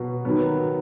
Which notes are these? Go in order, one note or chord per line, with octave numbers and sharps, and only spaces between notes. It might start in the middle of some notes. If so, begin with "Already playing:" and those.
Already playing: B2 F#3 B3
D#3 F#3 B3